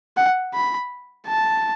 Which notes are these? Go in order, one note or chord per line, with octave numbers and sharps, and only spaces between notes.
F#5
B5
A5